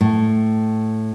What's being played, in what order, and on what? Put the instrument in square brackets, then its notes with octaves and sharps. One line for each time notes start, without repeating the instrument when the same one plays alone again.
[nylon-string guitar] A2